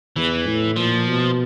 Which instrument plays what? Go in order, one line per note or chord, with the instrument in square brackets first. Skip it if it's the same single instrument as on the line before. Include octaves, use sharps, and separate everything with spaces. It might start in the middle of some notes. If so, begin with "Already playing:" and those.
[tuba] E2 [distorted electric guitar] E3
[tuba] A2
[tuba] A#2 [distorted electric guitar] F3
[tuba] B2